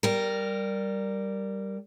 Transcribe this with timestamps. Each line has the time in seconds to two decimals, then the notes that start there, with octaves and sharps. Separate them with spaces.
0.03 G3 A#4